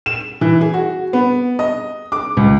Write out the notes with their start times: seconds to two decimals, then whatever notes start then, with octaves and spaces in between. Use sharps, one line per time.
0.06 E7
0.41 E3
0.61 G#4
0.74 F#4
1.13 B3
1.59 D#5
2.12 D6
2.37 C#2